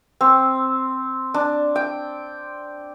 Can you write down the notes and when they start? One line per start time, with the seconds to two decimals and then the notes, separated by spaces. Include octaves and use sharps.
0.21 C4
1.34 D4
1.76 G5